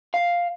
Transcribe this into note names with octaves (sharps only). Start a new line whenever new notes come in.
F5